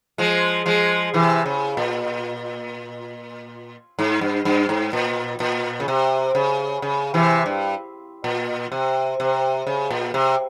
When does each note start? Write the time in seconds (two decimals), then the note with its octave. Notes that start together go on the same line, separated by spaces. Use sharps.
0.18 F3 G#3
0.66 F3 G#3
1.14 C3 E3
1.46 C#3
1.77 A#2
3.99 G#2
4.21 G2
4.45 G2
4.69 G#2
4.93 A#2
5.40 A#2
5.80 C#3
5.88 C3
6.35 C#3
6.82 C#3
7.14 C3 E3
7.46 G2
8.24 A#2
8.72 C3
9.20 C3
9.67 C#3
9.90 A#2
10.14 C3